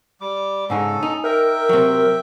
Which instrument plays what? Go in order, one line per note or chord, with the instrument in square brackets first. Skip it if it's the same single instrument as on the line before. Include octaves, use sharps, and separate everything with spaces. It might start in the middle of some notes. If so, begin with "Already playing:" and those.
[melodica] G3 D6
[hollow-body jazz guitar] G#2 C#3 D#4 [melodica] C#4 A4
[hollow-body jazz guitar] D#4
[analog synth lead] A#4 [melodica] E5 G5
[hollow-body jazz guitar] C3 F#3